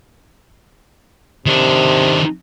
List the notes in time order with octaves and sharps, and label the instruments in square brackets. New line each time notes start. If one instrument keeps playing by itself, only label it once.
[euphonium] C3 [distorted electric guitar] D#3 D4